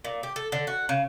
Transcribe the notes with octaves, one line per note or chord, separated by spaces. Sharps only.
A#2
G4
A4
D3
F#4
C#3